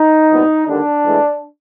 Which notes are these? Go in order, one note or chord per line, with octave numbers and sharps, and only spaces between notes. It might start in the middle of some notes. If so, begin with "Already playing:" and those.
Already playing: D#4
C2 A#2 G3 B3
D#2 D3 G3 A#3 D4
A2 E3 G#3